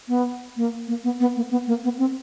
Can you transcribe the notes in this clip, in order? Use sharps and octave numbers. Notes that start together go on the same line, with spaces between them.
B3
A#3
A#3
B3
B3
A#3
B3
A#3
B3
C4